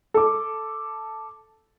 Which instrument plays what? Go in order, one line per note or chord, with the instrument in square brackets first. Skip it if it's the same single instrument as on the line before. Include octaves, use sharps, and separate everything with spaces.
[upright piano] A4 D6